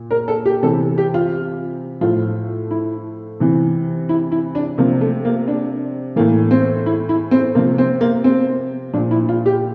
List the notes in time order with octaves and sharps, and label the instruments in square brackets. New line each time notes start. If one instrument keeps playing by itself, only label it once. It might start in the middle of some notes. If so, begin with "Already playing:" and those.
Already playing: [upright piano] A#2
A#4
A4
G4
C3 E3 A4
G4
F4
A2 F3 F4
E4
C3 E3
E4
E4
D4
C3 F3 A#3
A3
A#3
D4
A2 E3 A#3
C4
E4
E4
C4
C3 F3 A#3
C4
A#3
C4
A#2 F3 D4
E4
F4
G4